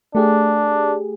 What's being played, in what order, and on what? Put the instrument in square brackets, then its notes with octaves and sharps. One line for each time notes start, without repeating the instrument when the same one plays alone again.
[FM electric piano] A3 G4 G#4 [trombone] D4